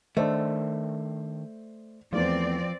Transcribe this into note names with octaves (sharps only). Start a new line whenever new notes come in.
D#3 A3 D4 C5 D5 D#5
E2 F3 A3 C4 D5